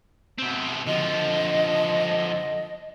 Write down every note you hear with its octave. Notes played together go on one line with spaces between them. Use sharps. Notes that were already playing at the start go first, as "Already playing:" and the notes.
B2 C4
D3 F3 D#5